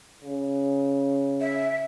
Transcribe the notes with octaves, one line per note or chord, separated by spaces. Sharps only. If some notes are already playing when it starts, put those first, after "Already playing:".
C#3
E5